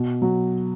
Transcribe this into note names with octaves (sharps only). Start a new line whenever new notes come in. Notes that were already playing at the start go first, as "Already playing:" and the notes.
Already playing: B2
F#3